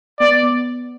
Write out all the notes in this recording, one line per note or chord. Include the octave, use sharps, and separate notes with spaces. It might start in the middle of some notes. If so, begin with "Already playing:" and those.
B3 D5
B3